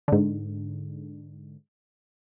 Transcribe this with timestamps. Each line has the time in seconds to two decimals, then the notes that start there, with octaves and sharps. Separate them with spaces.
0.08 G#2 D3